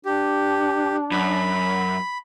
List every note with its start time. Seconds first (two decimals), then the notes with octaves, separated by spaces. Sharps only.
0.05 D4 G4
1.12 F#2 B5